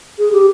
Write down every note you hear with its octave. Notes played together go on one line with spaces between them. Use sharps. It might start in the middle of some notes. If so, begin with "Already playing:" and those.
G#4
G4